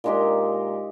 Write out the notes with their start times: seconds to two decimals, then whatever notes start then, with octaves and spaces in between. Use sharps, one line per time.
0.04 A#2 G#3 D#4 G4